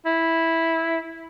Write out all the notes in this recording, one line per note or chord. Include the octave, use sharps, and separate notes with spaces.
E4